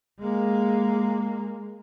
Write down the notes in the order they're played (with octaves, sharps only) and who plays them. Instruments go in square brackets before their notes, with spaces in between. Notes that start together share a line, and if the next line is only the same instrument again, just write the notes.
[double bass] G#3 A#3